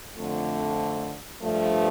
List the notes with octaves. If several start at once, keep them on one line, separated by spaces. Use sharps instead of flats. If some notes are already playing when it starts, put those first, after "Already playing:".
F2 D3 A3
G2 F3 A3